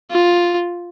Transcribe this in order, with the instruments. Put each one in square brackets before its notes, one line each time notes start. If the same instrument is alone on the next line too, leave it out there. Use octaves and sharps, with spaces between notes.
[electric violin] F4